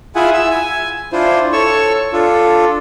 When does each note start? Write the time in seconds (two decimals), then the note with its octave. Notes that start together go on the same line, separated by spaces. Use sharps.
0.16 E4 F4 G#4 E5 F#5 G#5
0.33 E5 E6
0.50 G#5
1.13 D4 E4 F4 C5
1.52 A4 C#5 C#6 E6
2.13 D4 F4 A4